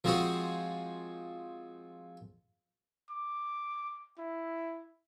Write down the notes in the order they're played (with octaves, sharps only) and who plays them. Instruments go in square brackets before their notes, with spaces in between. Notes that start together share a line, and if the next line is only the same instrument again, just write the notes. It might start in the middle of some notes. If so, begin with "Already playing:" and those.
[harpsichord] F3 G#3 C4 F#4 G#4
[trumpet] D6
E4